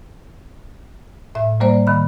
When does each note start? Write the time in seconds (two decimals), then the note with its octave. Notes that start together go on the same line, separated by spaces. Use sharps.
1.35 A2 E5
1.60 G3 A#3 C5 D5
1.87 D#3 B5